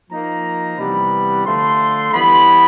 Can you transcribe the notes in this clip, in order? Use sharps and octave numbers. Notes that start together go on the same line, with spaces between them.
F3 A#3 D#4 A#5
C3 E3 G3 B3 B5
D3 F3 A3 C6
E3 G3 B3 B5